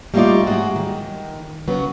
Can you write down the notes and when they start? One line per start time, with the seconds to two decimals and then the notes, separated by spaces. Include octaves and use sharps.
0.14 G3 A3 A#3 D#4 F4 D5
0.46 G#2 F#3 F#4 G#4
0.76 D#3
1.67 C#3 F#3 B3 C#4